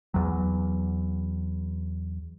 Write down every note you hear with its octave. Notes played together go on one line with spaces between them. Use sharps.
E2 F#3